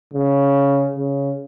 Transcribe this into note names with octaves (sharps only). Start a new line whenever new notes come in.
C#3
C#3